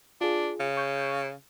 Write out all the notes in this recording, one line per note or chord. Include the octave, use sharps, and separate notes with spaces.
D4 F4 G#4
C#3
C#6 G6